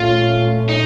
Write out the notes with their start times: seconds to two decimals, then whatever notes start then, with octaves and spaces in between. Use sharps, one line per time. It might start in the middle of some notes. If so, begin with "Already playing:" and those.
Already playing: A#2 A3 C#4 F4
0.69 D#4